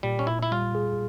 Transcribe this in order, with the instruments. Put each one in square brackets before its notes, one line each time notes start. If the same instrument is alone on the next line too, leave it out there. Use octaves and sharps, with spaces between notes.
[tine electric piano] A#2 [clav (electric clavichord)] G3
[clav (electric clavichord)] C#4
[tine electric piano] A#2 [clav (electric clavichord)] E4
[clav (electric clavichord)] E4
[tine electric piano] G3 [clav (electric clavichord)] F4
[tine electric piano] G#4